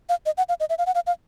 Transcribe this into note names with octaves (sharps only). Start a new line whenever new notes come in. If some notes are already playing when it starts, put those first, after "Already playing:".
F5
D#5
F#5
F5
D#5
E5
F5
F#5
F5
F5